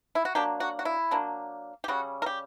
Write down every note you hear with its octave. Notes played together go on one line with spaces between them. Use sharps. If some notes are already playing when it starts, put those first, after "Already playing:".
E4
F#4
F#3 A#3 D4 G4
F#4
F#4
E4
F#3 A#3 D4
G4
C#3 G3 C#4 F#4
A#4
G4